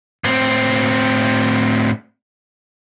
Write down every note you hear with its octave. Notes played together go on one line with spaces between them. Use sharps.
A2 C4